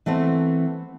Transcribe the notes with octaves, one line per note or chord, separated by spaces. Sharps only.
E3 A3 B3 C4